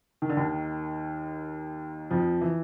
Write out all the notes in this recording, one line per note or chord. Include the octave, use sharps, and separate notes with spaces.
D#3
D3
D#2 D#3
F2 F3
E3